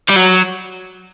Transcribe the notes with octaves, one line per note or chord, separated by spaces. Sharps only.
G3
F#3